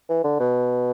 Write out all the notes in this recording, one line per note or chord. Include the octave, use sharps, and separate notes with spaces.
E3
D3
B2